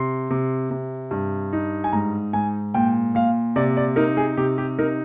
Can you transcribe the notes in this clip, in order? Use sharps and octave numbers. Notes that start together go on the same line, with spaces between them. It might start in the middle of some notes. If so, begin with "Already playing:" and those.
Already playing: C3 C6
C3
C3
G2
D#4
G#5
G#2 A#5
G#2 G#5
A#2 G5
A#2 F5
C3 D5
D5
D#4 A#4
G#4
C3 G4
G4
D#4 A#4